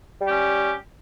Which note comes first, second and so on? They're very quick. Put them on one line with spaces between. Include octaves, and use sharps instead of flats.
G3 G4 C#4